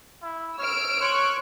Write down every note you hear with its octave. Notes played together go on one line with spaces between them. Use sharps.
E4
C#5 E6 F6 D7
C#5 C6 C#6 F#6